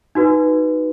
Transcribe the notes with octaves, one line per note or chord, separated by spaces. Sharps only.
D#4 F#4 B4